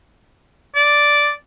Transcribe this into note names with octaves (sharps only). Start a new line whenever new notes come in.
D5